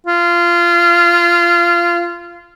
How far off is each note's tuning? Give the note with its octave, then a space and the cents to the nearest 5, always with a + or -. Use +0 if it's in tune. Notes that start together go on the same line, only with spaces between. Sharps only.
F4 -20